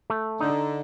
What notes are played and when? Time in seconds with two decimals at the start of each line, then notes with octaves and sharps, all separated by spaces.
0.10 A3
0.40 D3 D#4